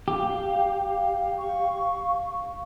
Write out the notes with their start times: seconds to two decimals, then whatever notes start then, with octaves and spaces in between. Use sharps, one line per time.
0.08 G4 F5
1.39 C#6